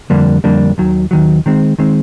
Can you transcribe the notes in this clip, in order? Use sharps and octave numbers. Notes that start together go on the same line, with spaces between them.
F2 D3 G3 A#3 D4
F2 D3 G3 A#3 D4
D#2 D#3 F#3
D#2 D#3 F#3
D#3 G#3 C4
D#3 G#3 C4